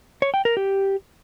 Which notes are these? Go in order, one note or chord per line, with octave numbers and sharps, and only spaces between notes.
C#5
G5
A#4
G4